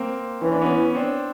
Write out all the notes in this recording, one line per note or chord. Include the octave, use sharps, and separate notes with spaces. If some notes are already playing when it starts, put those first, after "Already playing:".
Already playing: A#3 C4
E3 C#4
D4
B3 C#4
C4 D4